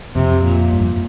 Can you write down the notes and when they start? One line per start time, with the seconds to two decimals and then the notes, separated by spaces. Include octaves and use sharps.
0.15 F2 C3
0.44 A#2
0.73 G2
0.81 F2